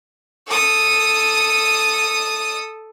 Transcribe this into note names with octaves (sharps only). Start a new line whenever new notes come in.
A4 D#6